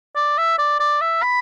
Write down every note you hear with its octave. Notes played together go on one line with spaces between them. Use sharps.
D5
E5
D5
D5
E5
B5